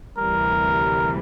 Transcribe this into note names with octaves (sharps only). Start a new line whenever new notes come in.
D2 C3 E3 G3 A#4